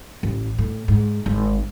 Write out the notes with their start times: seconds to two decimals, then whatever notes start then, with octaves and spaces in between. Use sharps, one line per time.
0.23 A1
0.58 A2
0.88 G#2
1.26 G#1